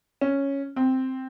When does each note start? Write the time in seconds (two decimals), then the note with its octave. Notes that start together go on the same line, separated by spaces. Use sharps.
0.21 C#4
0.76 C4